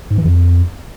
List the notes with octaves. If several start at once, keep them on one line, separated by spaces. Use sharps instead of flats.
G#2
E3
F2